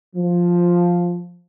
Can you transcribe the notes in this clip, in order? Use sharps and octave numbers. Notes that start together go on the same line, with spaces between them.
F3